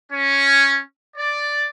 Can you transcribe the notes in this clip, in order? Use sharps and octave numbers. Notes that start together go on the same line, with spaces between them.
C#4
D5